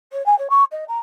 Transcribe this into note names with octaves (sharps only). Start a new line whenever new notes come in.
C#5
G#5
C#5
C#6
D#5
A#5